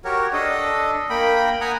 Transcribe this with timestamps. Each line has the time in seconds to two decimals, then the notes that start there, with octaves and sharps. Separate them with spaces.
0.04 F#4 G4 A#4 C#5
0.33 D4 A4 D#5
1.10 A#3 G5 B5
1.61 F#5 G#5 A#5 D#6